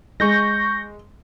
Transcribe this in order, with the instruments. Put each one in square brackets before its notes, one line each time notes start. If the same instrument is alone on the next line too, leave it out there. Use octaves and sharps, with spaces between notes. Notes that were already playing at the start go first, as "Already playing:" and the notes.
[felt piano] G#3 [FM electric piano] C#6 G6 A#6